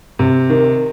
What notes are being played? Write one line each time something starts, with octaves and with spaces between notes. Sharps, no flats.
C3
D#3